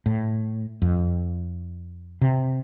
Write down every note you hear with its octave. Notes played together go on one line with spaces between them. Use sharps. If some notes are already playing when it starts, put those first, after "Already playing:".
A2
F2
C3